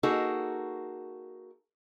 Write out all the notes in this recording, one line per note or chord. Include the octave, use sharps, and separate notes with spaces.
A#3 D#4 F#4 G#4 A4